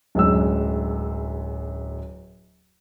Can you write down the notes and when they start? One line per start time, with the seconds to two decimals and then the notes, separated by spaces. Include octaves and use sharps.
0.15 D1 F#2 G#3 E6